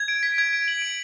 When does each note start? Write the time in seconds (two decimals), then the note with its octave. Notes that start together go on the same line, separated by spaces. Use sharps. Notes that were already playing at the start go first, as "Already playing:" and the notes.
Already playing: G#6
0.08 D7
0.23 B6
0.38 G#6
0.53 D7
0.68 F#7
0.82 D7